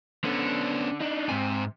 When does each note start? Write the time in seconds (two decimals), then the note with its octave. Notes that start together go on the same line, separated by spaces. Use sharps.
0.24 D3 B3 C#4
1.01 D4 D#4
1.29 G#2 C3 G#5